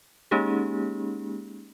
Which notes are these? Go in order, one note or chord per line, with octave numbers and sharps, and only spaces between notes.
G#3 A#3 C#4 D#4 G4 G#4